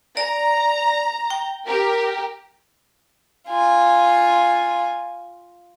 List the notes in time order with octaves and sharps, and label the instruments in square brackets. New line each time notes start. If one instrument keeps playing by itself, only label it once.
[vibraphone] D5 [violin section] A#5
[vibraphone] G5
[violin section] G4 A#4
[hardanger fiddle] F4 G#5